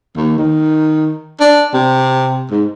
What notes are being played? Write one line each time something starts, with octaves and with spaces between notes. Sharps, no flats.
D#2
D#3
D4
C3
G#2